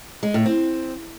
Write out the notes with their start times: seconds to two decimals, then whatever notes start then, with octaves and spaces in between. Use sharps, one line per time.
0.23 G#3
0.34 A2
0.46 C4